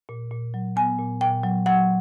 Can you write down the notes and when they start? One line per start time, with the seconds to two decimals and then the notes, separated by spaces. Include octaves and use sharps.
0.09 A#2
0.31 A#2
0.54 F#3
0.76 B3 G#5
0.99 A#2
1.21 A#2 G5
1.43 F#3
1.66 F#3 F#5